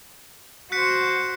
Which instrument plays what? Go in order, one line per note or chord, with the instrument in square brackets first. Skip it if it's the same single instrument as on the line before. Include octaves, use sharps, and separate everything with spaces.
[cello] F#4 C5 [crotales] F#6 B6 C#7